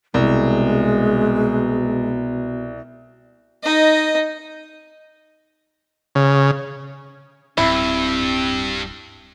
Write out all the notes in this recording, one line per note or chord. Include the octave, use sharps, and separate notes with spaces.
C2 B2 G#3
D#4 D#5
C#3
D1 G2 C4 E4